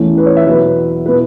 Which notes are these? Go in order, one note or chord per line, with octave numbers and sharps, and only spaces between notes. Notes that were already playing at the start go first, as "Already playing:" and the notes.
Already playing: E2 E3 A3 C#4 E4
B4
C#5
E5
E2 B2 F#3 B4
B2 B3 E4 B4